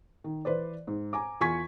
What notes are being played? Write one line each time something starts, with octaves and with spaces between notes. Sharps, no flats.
D#3
E3 B4 C5 D5
G#2
G#5 A#5 D6
E2 F4 G#5 C#6 G#6 B6